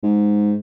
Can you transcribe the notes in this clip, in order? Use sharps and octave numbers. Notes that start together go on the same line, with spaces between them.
G#2